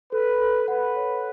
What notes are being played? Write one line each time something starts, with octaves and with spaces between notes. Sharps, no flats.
A4 B4
A4
B4 F#5
C#5